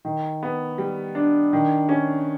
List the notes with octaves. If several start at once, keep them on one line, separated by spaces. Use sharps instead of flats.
D#3
B3
G3
D4
D#3
C#4